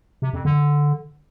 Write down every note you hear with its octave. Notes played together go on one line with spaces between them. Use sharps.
C3
F2
D3